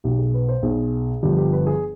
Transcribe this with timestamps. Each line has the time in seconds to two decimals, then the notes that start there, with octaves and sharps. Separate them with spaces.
0.04 B1 B2 G4
0.19 G#4
0.34 B4
0.49 C5
0.63 B1 B2 G#4
1.23 G1 G2 F3 G4
1.37 G4
1.52 B4
1.67 G#4